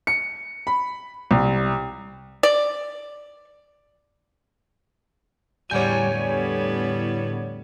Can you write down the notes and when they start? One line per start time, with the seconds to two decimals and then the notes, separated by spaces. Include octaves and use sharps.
0.07 C#7
0.67 B5
1.31 C2
2.43 D5
5.71 E2 A2 D3 G3 C#5 F#5 G#5 G6
6.14 G3 B3